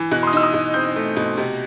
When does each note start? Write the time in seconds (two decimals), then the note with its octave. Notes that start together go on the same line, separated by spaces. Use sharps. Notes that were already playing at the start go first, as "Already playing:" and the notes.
Already playing: E3
0.12 B2 F#6
0.23 C6
0.27 D#6
0.33 D#4 E6
0.43 D#6
0.54 B2
0.74 C4 G6
0.96 A3
1.17 B2
1.38 C3